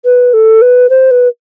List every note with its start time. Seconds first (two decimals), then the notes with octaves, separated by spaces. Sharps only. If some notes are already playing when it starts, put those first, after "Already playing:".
0.05 B4
0.34 A4
0.62 B4
0.90 C5
1.11 B4